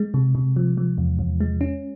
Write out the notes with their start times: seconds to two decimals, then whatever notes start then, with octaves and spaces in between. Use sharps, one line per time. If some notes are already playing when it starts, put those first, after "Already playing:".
Already playing: G#3
0.14 C3
0.35 C3
0.56 F3
0.77 F3
0.98 E2
1.19 E2
1.40 G#3
1.61 C#4